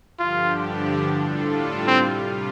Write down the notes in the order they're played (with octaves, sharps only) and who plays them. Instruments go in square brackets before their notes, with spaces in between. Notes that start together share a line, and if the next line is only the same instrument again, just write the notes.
[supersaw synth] G2 D3 F3 D4 G4 [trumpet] F4
[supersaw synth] A2 G3 D4 F4 A4
[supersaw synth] C3 G3 F4 [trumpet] C4